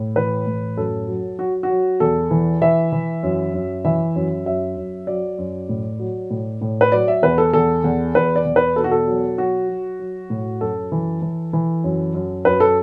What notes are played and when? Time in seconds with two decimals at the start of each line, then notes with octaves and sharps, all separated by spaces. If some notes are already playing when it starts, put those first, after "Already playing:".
Already playing: A2
0.16 E3 B4
0.47 A2
0.77 F#2 A4
1.08 F#3
1.39 F#3 F#4
1.63 F#4
1.70 F#3
2.00 E2 A4
2.31 E3
2.62 E3 E5
2.92 E3
3.23 F#2
3.54 F#2
3.85 E3 E5
4.16 F#2
4.46 F#2 E5
4.77 F#2
5.07 F#3 D5
5.38 F#2
5.69 A2
6.00 F#3
6.30 A2
6.61 A2
6.81 B4
6.92 F#3 D5
7.08 E5
7.23 E2 B4
7.38 A4
7.53 E2 A4
7.84 E2
8.15 E2 B4
8.36 D5
8.46 E2
8.56 B4
8.76 B2 A4
8.84 F#4
8.91 A4
9.07 F#3
9.38 F#3 F#4
9.69 F#3
10.00 F#3
10.30 A2
10.61 F#2 A4
10.92 E3
11.22 E3
11.53 E3
11.84 F#2
12.14 F#2
12.45 F#2 B4
12.60 A4